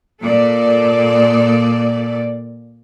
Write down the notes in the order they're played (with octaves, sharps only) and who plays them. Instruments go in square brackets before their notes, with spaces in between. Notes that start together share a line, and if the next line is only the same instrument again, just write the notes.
[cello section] A#2 A4 D5